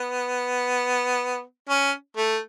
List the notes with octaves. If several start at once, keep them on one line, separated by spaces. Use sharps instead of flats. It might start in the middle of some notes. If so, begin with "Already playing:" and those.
Already playing: B3
C#4
A3